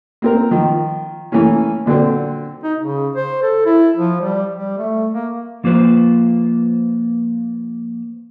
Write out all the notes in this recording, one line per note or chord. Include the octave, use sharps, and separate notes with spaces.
A#3 C4 A#4
D#3 F3
E3 A3 A#3 C#4
A#2 D3 F#3 C4
D#4
C#3
C5
A4
E4
F3
G3
G3
A3
A#3
F3 A#3 F4 B4 C5